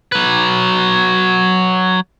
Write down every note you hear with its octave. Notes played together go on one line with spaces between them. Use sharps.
F#3 B4